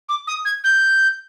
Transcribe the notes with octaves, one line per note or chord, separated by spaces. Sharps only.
D6
D#6
G#6
G6